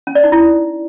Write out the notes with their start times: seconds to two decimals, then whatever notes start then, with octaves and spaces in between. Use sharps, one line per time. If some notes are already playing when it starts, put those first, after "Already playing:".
0.07 C#4
0.15 D5
0.24 D#4
0.32 E4